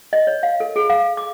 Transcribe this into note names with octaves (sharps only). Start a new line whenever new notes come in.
D#5
C#5
F5
A4
G#4
F5
D6